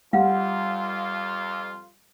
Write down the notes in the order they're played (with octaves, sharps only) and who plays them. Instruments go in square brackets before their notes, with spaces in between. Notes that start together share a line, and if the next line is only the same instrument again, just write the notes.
[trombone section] F2 F4 [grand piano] G3 [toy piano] F5 F#5